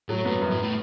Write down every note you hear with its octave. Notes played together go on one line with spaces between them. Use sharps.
A2 F#3
G2 B3
F#2
A2
A2